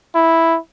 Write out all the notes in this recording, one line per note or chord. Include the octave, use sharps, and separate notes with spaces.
E4